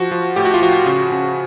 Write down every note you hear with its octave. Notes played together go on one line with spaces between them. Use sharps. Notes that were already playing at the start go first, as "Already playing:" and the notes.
Already playing: F3 F#4
F3
A2 G4
F#4
F4
F3 F#4
C#3
C#3